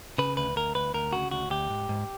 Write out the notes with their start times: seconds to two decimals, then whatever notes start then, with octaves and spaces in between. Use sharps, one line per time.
0.18 C#3 B4
0.37 D2 B4
0.56 D2 A#4
0.75 D2 B4
0.94 D2 A#4
1.13 C#3 F#4
1.31 D2 F#4
1.50 D2 G4
1.70 G#2
1.89 G#2